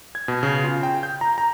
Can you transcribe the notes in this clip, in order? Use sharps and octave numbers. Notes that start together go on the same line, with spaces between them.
G#6
B2
C#3
F4
G5
G6
A#5
A#5